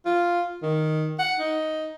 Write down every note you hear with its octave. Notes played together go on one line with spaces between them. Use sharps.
F4
D#3
F#5
D#4